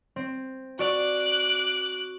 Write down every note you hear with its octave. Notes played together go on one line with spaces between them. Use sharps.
C4
F#4 D5 D6 F#6